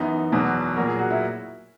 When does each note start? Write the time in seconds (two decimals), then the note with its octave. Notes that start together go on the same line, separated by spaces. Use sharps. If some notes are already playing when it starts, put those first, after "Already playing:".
Already playing: F#2 E3 B3 D#4
0.32 E2 B2 F#3
0.76 A#2 F#3 A#4
0.87 G#4
0.99 F#4
1.10 E4